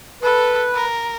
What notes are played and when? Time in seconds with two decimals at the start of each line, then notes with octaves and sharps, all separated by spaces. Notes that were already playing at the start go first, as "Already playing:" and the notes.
0.23 A4 B4
0.74 A#4